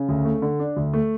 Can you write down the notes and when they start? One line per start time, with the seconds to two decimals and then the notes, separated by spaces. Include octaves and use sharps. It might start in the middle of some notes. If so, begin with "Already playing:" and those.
Already playing: C#3
0.09 D2
0.25 A3
0.42 D3
0.59 D4
0.77 D2
0.93 A3